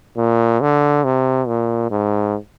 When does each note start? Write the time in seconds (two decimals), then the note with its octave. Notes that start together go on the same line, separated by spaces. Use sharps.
0.17 A#2
0.61 D3
1.04 C3
1.47 A#2
1.91 G#2